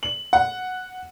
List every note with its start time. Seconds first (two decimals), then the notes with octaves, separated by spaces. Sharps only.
0.03 F#7
0.33 F#5